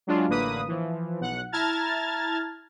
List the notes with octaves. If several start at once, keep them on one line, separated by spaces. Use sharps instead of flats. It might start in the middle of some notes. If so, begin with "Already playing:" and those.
F#3 G#3 D4 F4
A1 D3 A#3 B4 D#6
E3 F3
B1 F#5 F#6
E4 A5 A#5 F6 G#6 A6